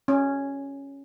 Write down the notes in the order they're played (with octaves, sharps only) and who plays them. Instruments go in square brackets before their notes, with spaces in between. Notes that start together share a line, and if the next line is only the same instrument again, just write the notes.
[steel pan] C#4